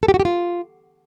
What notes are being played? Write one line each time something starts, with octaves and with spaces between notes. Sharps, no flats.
A4
G4
F#4
G4
F4